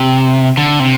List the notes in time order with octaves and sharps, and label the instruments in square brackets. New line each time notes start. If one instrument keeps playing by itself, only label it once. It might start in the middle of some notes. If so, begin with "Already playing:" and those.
Already playing: [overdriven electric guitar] C3
D3
C3